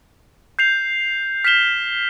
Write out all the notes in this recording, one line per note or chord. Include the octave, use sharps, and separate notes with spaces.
G6 C7 F7
F6 B6 E7 G7